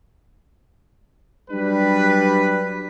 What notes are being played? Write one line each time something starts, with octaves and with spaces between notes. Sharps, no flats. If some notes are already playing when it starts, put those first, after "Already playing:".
F#3 G3 D4 B4